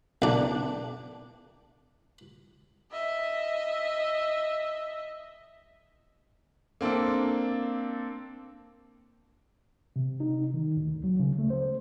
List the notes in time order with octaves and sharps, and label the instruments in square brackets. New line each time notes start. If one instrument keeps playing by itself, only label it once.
[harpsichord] B1 D4
[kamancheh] D#5 E5
[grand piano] A#3 C4 D4 A4
[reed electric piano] C3
D#4
D#3
D2
F#3
C#3
A3
C5